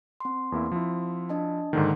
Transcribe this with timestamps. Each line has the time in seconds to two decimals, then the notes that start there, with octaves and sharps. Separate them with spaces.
0.20 C4 C6
0.52 E2 A#3 E4
0.72 F3 E4
1.29 D4 D#5 A5
1.73 G#2 D3 D#3 A#3